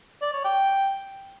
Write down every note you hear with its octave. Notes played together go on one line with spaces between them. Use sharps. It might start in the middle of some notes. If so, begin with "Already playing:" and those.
D5
C#5
G5